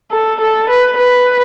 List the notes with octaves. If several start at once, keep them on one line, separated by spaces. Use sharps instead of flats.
A4
A4
B4
B4